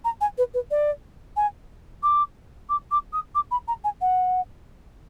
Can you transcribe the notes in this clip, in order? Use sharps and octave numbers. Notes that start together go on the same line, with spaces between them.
A#5
G#5
B4
B4
D5
G#5
D6
D6
D6
D#6
D6
B5
A#5
G#5
F#5